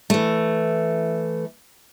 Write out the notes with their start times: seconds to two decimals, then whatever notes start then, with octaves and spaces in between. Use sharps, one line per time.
0.10 E3 A3